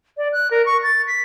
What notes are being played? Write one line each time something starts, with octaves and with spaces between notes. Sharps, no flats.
D5
F#6
A#4
C#6
A6
B6